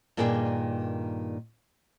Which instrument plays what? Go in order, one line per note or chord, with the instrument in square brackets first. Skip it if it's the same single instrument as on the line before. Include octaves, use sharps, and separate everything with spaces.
[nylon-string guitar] G2 A#2 D#3 A#3 G#4 G5